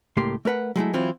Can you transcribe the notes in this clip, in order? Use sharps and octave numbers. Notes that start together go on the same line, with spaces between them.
C#2 A2 A#3 G4 C6
A3 A#4 B4 F#5
F#3 G#3 A3 E4
E3 F#3 C4 E4 F4